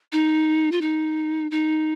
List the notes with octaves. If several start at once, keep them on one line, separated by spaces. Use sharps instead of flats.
D#4
F4
D#4
D#4